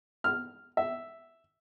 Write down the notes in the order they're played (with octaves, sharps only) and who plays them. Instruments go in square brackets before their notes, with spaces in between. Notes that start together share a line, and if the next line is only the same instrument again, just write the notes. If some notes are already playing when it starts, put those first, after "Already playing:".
[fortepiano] F6
E5